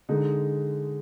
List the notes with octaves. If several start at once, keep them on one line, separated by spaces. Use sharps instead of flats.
D3 G#3 D#4